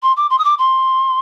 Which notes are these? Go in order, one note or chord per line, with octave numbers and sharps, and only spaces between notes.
C6
D6
C6
D#6
D6
C6